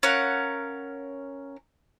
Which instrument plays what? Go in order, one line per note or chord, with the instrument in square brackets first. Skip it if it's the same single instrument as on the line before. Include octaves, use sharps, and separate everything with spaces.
[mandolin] C#4 A#4 F5 F#5